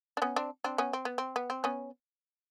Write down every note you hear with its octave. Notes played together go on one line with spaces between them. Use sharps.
D4
B3 C#4
C4 D4
C4 D4
B3 C#4
C4
B3
C4
B3
C4
B3 C#4